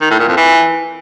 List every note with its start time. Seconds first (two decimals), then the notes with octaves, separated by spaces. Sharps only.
0.01 D#3
0.10 A2
0.19 A#2
0.28 F2
0.37 E3